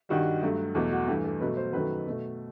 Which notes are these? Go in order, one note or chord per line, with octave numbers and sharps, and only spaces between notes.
G2 D#3 G3 F#4
G2 F#3 A3
E2 B2 F#3 A3 F#4
F#4
G2 E3 A3 G4
A4
B2 F#3 A3 B4
C5
F#2 D#3 F#3 A3 B4
B2 A3